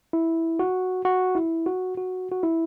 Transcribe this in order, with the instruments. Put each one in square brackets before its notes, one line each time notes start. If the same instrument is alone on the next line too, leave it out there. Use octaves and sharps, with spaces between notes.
[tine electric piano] E4
F#4
F#4
E4
F#4
F#4
F#4
E4